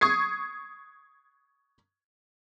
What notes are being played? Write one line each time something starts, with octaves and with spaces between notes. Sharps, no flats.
C#6 D#6 G#6 C7